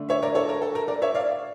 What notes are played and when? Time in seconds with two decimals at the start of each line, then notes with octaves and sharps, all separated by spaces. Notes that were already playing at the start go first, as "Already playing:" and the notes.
Already playing: D3 A3 D4
0.09 C#5 E5
0.22 A#4 D5
0.35 A4 C#5
0.49 A#4
0.62 A4
0.75 A#4
0.88 A#4 D5
1.02 C#5 E5
1.15 D5 F5